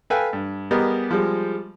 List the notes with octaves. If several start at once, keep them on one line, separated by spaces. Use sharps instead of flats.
A4 B4 F5 G5 G#5
G2
G3 B3 G4 G#4 A#4 D#5
F3 G3 G#3